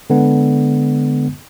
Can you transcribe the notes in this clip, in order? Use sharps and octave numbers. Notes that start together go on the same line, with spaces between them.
D3 G#3 B3